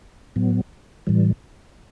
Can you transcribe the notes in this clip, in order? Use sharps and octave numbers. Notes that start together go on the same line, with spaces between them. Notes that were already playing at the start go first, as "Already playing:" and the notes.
A2 F#3 B3
A2 E3 G3